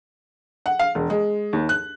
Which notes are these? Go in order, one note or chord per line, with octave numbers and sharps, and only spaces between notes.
F#5
F5
E1
G#3
D#2
F#6